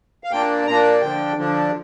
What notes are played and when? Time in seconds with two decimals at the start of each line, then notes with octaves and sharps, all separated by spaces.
0.24 F5
0.31 A#2 A#3 D4 G5
0.67 A#2 A#3 D4 A#5
1.01 D3 F3 D4 G5
1.36 D3 F3 D4